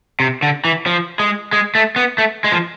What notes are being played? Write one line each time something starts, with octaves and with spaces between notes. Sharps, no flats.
C3
D3
E3
F3
G#3
G#3
A3
B3
A3
G#3
F3